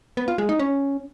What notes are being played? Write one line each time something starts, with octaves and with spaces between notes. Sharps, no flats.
B3
F4
G#3
D#4
C#4